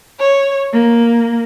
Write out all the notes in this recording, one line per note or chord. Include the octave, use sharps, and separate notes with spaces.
C#5
A#3